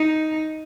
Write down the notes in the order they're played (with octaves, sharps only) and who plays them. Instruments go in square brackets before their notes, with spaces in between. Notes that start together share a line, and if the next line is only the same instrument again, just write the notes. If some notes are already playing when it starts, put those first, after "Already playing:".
Already playing: [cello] D#4